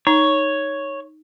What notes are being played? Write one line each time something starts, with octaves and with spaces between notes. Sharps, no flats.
D#4 C#5